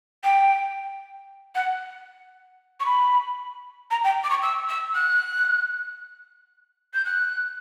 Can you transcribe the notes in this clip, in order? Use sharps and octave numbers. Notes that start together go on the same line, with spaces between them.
G5
F#5
C#6
B5
A#5
G5
D6
C#6
E6
E6
F#6
G6
F#6